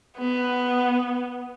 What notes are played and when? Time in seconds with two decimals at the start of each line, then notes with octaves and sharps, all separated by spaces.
0.18 B3